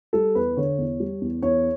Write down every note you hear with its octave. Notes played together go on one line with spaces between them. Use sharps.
G3 A4
E2 B4
D3 C#5
E2
G3
E2
E2 C#5